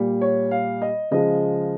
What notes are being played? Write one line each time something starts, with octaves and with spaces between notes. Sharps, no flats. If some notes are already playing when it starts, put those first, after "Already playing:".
Already playing: A#2 G3
C#5
F5
D#5
C#3 F3 G#3 D#5